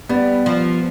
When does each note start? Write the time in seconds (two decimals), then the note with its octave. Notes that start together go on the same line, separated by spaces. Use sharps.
0.09 G3 B3
0.46 F3